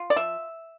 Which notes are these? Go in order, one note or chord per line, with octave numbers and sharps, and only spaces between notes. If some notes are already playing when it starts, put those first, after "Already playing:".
Already playing: F4
D5
F3 E5